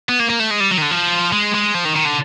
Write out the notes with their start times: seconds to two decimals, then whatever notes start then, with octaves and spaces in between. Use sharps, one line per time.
0.09 B3
0.20 A#3
0.30 A#3
0.39 A3
0.51 G#3
0.60 G3
0.71 F#3
0.78 D#3
0.82 D3
0.91 F3
1.32 G#3
1.54 G#3
1.74 F3
1.85 D#3
1.95 D#3
2.05 D3